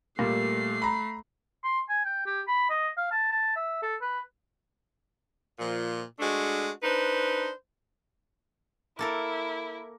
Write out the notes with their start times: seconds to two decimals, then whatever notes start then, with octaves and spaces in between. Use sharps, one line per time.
0.19 A#2 G3 A3 C7
0.82 A#5 B5
1.64 C6
1.89 G#5
2.05 G5
2.26 G4
2.47 B5
2.70 D#5
2.97 F5
3.11 A5
3.31 A5
3.56 E5
3.82 A4
4.01 B4
5.59 A#2 F3
6.19 G#3 A3 D4 F#4
6.82 D4 D#4 B4 C5
8.99 A#3 E4 A4 A#4